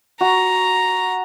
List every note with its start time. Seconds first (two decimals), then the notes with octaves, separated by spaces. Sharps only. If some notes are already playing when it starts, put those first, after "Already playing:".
0.21 F#4 A#5